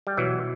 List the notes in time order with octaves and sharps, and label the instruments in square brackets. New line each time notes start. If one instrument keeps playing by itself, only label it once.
[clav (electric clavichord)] G3
[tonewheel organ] B2 [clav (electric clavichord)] E3 F#3